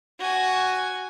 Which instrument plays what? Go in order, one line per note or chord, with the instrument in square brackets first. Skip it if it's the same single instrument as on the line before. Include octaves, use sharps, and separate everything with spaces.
[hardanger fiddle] F#4 G#5